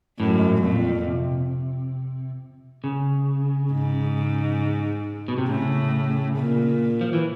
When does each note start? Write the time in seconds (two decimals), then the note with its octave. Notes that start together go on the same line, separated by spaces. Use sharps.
0.20 F#2 A2
0.35 G#2
0.49 A2
0.63 F2 A#2
1.08 C3
2.84 C#3
3.72 G#2
5.28 B2
5.38 C3
5.49 A2 C#3
6.37 A#2
7.01 F3
7.13 E3